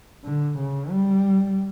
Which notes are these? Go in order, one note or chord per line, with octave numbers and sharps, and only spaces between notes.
D3
C#3
G3